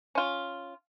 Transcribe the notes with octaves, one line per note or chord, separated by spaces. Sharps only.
C#4 F4